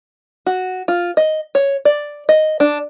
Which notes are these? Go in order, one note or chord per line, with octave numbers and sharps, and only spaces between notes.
F#4
F4
D#5
C#5
D5
D#5
D4